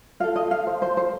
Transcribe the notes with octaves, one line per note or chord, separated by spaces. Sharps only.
F4 A4 F5
D#5
F5
C5
C5
C5